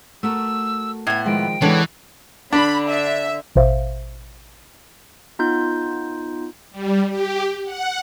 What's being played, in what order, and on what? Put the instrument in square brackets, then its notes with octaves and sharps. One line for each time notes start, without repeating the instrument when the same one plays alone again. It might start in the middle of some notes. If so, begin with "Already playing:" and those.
[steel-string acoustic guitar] A3 F#4 A#4 [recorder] E6
[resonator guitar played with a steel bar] A2 B3 [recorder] G#6
[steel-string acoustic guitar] D#3 F3 G#3 [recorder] G5
[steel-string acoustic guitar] C#3 G#3 A4 [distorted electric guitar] E3 [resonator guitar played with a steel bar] B3 D4 C#5
[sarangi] D3 [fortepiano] D4 [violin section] B5
[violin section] E5
[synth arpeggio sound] A1 B2 C5 E5 F5
[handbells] B3 D#4 F4 G6
[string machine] G3
G4
F#5